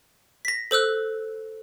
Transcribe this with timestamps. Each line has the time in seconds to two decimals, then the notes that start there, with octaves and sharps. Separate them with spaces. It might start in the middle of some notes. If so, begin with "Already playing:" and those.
0.45 A#6 B6
0.71 A4 C5 E6 F#6